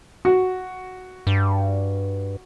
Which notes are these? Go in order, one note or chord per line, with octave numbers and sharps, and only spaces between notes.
F#4
G2